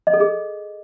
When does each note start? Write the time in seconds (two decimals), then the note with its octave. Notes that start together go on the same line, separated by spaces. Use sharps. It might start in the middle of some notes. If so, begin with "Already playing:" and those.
0.07 D#5
0.14 A4
0.20 G#4